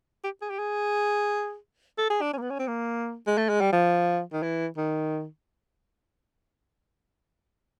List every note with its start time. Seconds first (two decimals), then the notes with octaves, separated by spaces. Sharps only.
0.24 G4
0.42 G#4
0.50 G4
0.59 G#4
1.98 A4
2.10 G#4
2.21 D4
2.33 C#4
2.38 A#3
2.42 B3
2.50 C#4
2.59 C4
2.68 A#3
3.27 G#3
3.38 A3
3.49 G#3
3.61 G3
3.73 F3
4.33 D#3
4.43 E3
4.77 D#3